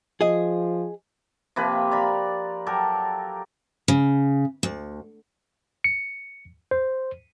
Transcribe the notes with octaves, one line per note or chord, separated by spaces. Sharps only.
F3 G#4 D#5
C3 F3 A#3 B4
A#4 D5 B5
F#3 G4 A4 A#4
C#3
D2
C#7
C5